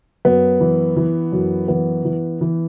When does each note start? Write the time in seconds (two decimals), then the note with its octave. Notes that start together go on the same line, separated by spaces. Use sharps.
0.25 F#2 B3
0.60 E3
0.96 E3
1.32 F#2
1.68 E3 B3
2.05 E3
2.41 E3